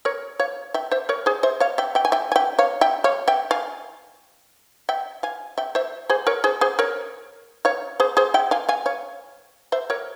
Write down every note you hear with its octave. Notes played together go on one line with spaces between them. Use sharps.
A#4 C#5
C#5 F5
E5 G5
C5 E5
A#4 C#5
G#4 C5
C5 E5
C#5 F5
E5 G5
E5 G5
G#5
E5 G5
G#5
E5 G5
C#5 F5
E5 G5
C#5 F5
E5 G5
F5 G#5
E5 G5
F5 G#5
E5 G5
C5 E5
G#4 C5
A#4 C#5
G#4 C5
G#4 C5
A#4 C#5
C#5 F5
G#4 C5
G#4 C5
E5 G5
F5 G#5
F5 G#5
C#5 F5
C5 E5
A#4 C#5